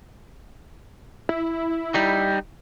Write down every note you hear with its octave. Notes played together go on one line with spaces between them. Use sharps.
E4
G3 D#4